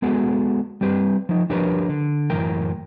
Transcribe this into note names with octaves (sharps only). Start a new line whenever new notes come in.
G#3 B3 F#4 G#4 A4
G3 C4 G4 B4
F3 D#4
F3 D4 G4 A#4 B4 C#5
D3
F#2 A2 E3 A#4 G5